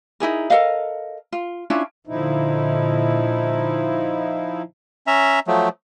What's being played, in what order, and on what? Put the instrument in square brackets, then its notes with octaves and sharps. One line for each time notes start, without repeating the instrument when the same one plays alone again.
[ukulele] D#4 E4 G#4 A#4
A4 A#4 D#5 F5
F4
C#4 D4 E4 F4
[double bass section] A#2 D3 [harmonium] F3 D#4 E4
[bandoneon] C#4 E5 A#5
F3 F#3 A3